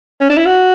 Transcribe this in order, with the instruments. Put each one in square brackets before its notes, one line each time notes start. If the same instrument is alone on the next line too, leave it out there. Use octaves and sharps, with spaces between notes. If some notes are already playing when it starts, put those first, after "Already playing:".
[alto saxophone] C#4
D4
E4
F#4